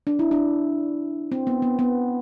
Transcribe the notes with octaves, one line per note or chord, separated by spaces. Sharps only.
D4
E4
D4
C4
B3
B3
B3